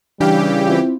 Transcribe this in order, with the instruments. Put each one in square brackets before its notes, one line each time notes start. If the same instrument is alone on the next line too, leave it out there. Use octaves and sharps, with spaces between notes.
[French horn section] C#3 G3 [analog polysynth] E3 G4 [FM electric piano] D4 F5
[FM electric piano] C4 E4 F4